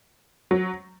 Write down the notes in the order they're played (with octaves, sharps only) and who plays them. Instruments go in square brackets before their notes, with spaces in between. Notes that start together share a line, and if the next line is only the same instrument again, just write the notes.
[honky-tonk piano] F#3